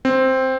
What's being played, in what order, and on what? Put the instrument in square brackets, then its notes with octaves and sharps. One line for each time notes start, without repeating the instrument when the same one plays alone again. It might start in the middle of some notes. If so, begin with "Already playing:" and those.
[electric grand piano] C4